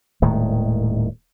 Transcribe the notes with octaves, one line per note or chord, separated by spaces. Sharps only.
D#1 A2 D#3 G#3